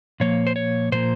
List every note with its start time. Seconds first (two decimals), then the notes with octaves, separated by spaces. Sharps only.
0.20 A#2 F3 A#3 C#5
0.47 C5
0.56 C#5
0.92 A#2 F3 A#3 C5